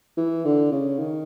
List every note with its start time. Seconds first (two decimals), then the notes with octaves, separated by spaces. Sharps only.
0.17 E3
0.45 D3
0.72 C#3
0.99 D#3